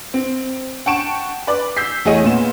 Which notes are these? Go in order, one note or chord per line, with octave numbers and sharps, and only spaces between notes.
C4
F#5 G5 A5 C#6 D7 E7
B4 D5
E6 G6 B6 C7
E2 A3 G#4 C#5 D#5 D#7
A#2 B3 E7